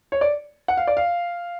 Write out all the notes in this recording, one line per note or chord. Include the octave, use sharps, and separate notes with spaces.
C#5
D5
F#5
F5
D5
F5